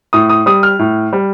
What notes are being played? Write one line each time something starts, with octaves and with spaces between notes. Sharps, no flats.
A2 D#6
D#6
G3 D#6
F6
A2
G3